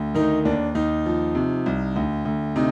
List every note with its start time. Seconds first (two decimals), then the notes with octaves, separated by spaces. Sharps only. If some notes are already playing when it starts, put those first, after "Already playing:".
Already playing: D2
0.15 D#3 D#4
0.45 D#2 D4
0.75 D#2 D#4
1.06 F3
1.35 C3
1.66 C2
1.96 D2
2.25 D2
2.56 C3 D#4